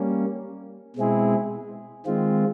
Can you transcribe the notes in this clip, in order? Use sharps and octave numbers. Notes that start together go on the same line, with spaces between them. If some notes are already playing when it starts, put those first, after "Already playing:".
Already playing: G3 A#3 C#4
B2 G#3 C4 E4 G#4
D#3 G#3 C4 F4